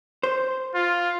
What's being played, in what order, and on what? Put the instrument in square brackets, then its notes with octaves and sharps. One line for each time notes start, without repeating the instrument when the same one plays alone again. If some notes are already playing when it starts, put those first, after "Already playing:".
[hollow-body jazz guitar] C5
[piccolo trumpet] F4